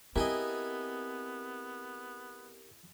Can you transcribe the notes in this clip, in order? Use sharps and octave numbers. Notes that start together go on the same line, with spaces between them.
B3 C4 E4 G4 G#4 A#4 D#5